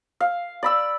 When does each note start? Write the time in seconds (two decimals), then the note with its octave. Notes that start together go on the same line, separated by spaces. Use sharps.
0.20 F5
0.63 D5 B5 E6